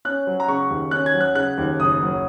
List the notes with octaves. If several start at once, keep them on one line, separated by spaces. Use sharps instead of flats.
C#4 F#6
F#3
A#5
C#3 C#6
D#2
C#4 F#6
G#6
F#3
F#6
C#3 F#6
D#2
F#1 D#6
F#3